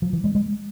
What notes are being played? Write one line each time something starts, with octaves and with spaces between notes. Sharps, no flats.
F3
E3
G#3
G#3